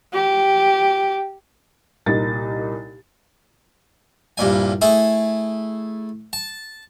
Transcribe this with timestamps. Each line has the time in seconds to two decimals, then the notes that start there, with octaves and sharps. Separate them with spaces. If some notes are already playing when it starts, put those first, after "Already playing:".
0.13 G4
2.06 C2 A#2 D#4 A6
4.37 C2 G2 A#2 G#5
4.81 A3 E4 G#4
6.33 A5